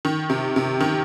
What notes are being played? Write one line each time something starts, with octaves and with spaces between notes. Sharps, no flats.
D#3
C3
C3
D#3